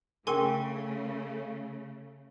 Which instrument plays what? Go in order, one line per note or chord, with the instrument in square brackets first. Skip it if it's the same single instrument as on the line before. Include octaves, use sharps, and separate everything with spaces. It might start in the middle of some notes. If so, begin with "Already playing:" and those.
[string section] C#3 A3 [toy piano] G#4 A#4 G5 [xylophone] G#5 C6 C#6